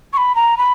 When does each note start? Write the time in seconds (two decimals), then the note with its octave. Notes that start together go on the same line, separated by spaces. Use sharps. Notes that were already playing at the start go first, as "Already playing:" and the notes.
0.13 C#6
0.17 B5
0.35 A#5
0.57 B5